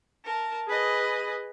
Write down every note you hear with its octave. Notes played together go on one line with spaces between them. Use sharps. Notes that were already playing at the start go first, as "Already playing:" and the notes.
A#4 A5
G#4 B4 D#5